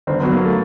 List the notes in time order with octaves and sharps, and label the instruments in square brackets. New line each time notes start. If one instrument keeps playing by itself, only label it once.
[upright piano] G1 [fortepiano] C4
[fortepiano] B3
[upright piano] F#3
[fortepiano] A#3
A3